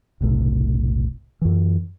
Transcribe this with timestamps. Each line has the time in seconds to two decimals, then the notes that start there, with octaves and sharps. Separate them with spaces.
0.21 F1 B1 A2 C3
1.41 F#2 E3